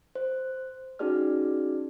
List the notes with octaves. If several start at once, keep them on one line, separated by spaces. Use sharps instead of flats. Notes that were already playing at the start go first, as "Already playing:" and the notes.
C5
C#4 D#4 F#4 G#4 D5 F6